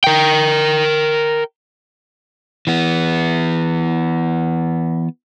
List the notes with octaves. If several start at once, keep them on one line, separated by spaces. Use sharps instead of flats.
A#4 G5
E3 B3